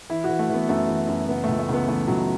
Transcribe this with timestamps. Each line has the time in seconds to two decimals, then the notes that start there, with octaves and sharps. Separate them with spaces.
0.10 E3 E4
0.24 E3 F#4
0.39 A3
0.49 E3 B3
0.69 F#2 A3
0.89 E3
1.08 F#2
1.29 C#3 B3
1.44 C#2 A3
1.59 A3
1.69 C#2 B3
1.88 E3 A3
2.08 C#2 F#3